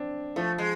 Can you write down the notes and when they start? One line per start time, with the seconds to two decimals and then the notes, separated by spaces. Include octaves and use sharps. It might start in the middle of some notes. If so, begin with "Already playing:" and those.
Already playing: C4 D4
0.36 F3 A3
0.58 G#3